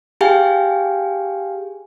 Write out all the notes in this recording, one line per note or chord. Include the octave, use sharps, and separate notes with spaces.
G4 G#4 F5 G5 G#5